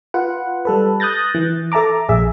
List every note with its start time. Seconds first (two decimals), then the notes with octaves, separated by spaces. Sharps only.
0.14 F4 B4 F#5
0.65 G3 A4 B4
1.00 D#6 F#6 G6 A6 A#6
1.35 E3
1.72 A4 E5 A5 A#5 D6
2.09 A#1 G#4 E5